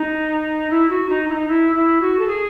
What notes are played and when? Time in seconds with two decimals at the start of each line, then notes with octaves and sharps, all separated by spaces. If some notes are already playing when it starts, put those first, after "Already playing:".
Already playing: D#4
0.70 E4
0.90 F#4
1.09 D#4
1.29 E4
1.33 D#4
1.49 E4
1.75 E4
2.01 F#4
2.19 A4
2.28 G#4